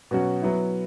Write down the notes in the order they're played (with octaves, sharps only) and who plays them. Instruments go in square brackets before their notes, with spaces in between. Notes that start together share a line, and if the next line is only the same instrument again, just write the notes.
[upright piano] B2 F#3 C#4 F#4
F#3 B3 E4